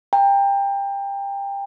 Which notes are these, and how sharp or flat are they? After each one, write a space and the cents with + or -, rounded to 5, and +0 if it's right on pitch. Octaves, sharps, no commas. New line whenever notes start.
G5 +25 A#5 -20